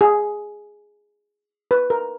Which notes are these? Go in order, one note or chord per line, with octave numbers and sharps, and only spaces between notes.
G#4
B4
A#4